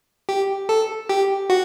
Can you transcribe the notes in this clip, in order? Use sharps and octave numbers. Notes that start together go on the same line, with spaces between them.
G4
A4
G4
F#4